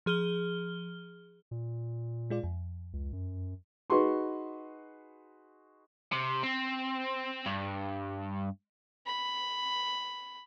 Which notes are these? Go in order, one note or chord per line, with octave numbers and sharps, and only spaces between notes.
F3 G#4 F6 G7
A#2
G#3 F4 D5
F2
C#2
F#2
D#4 F#4 G#4 B4 C6 C#6
C3
C4
G2
B5